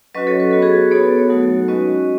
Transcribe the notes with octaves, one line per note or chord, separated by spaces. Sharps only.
F#3 C#4 F#4 B4 D#5
A4 C#5
B4
B3 F#4 A4
G#4 B4
B3 D#4 F#4 A4 C#5
F#3 A3 D#4 F#4
G#3 C#4 F#4 B4 D#5